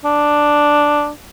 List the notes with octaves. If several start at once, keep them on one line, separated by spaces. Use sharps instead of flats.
D4